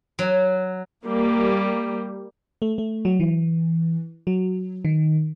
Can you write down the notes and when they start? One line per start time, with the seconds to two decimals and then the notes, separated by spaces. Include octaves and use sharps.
0.19 F#3
1.03 G3 A#3
2.62 A3
2.78 A3
3.05 F#3
3.20 E3
4.27 F#3
4.85 D#3